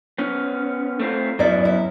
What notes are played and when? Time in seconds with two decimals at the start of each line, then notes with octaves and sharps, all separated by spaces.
0.18 B3 C#4
0.99 A3 C4 F4
1.39 F#3 B3 C#4 E4 D5
1.65 E4